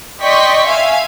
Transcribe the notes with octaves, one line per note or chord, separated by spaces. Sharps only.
D5 D#5 G5 C6 C#6 B6
E5 F5 G#5